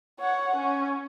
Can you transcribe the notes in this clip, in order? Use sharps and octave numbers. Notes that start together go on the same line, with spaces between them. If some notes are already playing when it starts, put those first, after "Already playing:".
C#5 F#5
C#4